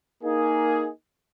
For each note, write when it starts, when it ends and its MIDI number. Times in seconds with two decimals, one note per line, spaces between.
0.23 0.89 58
0.23 0.89 63
0.23 0.89 68